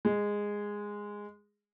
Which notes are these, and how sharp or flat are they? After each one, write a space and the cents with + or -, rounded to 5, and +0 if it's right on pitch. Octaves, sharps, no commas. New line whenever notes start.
G#3 -10